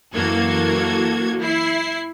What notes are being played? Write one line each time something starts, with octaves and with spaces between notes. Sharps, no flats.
F#2 E3 A#3 F#4 A4 G#6
E4 C7